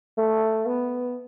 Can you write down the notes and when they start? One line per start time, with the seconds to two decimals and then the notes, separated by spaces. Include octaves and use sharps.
0.18 A3
0.66 B3